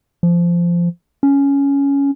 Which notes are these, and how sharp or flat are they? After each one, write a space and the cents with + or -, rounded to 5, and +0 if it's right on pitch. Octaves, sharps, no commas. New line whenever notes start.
F3 -15
C#4 +10